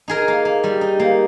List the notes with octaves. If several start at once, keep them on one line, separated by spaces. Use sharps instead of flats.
D#4 G#4 A#4
A#3
A#3
G3
D#4
A#3